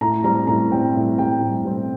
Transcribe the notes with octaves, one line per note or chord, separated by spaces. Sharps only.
A2 A#5
G3 C4 A#5
A2 A#5
G3 C4 G5
A2
G3 C4 G5
A2
G3 C4